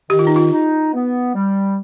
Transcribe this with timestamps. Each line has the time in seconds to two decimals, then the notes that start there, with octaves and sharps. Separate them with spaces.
0.10 D#3 G4
0.19 F4
0.27 D#4
0.36 F4
0.52 D#4
0.93 B3
1.35 G3